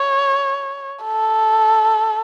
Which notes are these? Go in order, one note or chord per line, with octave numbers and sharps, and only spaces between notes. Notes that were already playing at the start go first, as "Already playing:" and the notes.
Already playing: C#5
A4